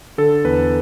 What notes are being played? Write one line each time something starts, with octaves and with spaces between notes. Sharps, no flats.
D3 A4
E2 B4